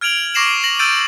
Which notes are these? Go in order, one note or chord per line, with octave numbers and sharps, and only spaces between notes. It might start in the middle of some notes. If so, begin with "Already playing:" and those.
F6 G#6 D7 F7 F#7
C#6 D6 A#6 C7 E7 F#7
A#6 F#7
E6 G6 A6 D7 D#7